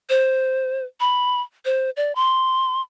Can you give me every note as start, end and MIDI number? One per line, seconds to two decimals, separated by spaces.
0.09 0.85 72
1.00 1.41 83
1.65 1.90 72
1.97 2.15 74
2.15 2.81 84